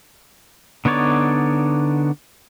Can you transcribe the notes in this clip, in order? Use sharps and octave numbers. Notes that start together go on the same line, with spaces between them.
D3 B3 D#4 C#5 D5